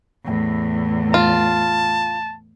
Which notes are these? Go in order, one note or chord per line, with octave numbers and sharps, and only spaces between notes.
E2 A2
F4 A5